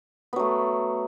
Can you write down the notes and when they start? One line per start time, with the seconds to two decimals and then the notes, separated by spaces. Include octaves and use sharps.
0.33 B3
0.36 F#3
0.40 A3